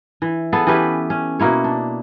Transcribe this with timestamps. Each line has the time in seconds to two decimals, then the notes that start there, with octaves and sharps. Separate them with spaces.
0.22 E3
0.53 B3 G#4 A4
0.67 E3 C#4 G4 B4
1.10 C#4
1.40 B2 A#3 E4 C#5
1.64 D4